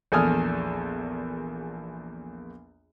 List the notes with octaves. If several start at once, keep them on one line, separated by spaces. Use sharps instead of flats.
A#1 E2 A4 G#5 D#6 F6